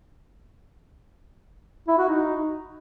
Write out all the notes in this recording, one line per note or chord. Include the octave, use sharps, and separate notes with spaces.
E4
F#4
D#4